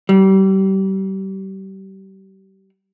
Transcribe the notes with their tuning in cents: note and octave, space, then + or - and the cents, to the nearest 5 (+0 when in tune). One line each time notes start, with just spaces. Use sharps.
G3 -30